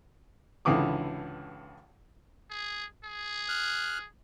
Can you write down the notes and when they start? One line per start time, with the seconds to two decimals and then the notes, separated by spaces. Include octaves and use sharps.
0.65 G#1 C#2 D3 E3 D6 D#6
2.51 G#4
3.05 G#4
3.49 F6 F#6